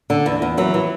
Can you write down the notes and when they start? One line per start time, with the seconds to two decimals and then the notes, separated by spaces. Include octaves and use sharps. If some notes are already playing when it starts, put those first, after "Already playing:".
0.10 D3
0.26 E2
0.42 E2
0.57 E3 F#3
0.74 E3